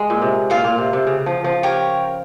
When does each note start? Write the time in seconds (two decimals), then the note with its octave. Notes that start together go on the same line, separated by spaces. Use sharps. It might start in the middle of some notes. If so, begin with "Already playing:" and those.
Already playing: G#3
0.10 A#2
0.22 C3
0.50 A#2 F4 C5 F5 C6
0.64 A#2
0.78 C3
0.93 C3
1.07 C#3
1.26 F3
1.44 F3
1.63 G4 A#4 C#5